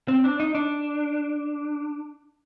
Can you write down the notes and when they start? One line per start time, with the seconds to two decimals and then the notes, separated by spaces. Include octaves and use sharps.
0.08 C4
0.24 D4
0.40 D#4
0.55 D4